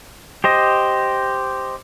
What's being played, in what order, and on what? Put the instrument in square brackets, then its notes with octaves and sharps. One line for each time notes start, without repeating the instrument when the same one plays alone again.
[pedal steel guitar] G4 C5 D#5